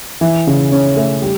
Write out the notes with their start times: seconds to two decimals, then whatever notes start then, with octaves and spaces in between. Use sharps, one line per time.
0.21 E3
0.47 C#3
0.72 C#4
0.96 A3
1.22 G3